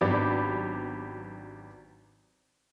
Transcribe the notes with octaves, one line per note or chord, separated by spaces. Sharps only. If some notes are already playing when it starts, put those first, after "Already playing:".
G#1 F#3 B3 D4 G4 B5